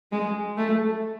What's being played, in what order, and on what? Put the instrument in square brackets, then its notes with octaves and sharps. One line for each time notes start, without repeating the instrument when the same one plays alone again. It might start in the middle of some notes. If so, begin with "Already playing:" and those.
[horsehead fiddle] G#3
A3